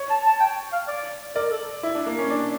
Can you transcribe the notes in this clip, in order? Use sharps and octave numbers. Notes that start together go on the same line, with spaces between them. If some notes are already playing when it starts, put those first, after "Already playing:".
Already playing: C#5
A5
A5
G5
F5
D5
A#4 D5
A4
E4
D4
A#3
C#4
D4